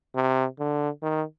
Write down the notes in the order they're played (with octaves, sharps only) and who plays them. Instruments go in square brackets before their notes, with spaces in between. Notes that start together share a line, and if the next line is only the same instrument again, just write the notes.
[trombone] C3
D3
D#3